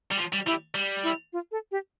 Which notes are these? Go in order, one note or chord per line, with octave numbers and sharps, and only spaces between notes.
G3
F3
G3
G3 E4
G3
E4
F4
A4
G4